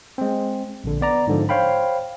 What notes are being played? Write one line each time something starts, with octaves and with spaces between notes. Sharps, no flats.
G#3 C4
A#1 D3
B3 D5 A#5
G#2 D3 F3
C5 C#5 F5 G5 B5